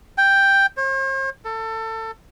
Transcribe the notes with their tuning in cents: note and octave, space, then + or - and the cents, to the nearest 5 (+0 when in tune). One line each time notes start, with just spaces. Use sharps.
G5 +5
C5 +45
A4 +25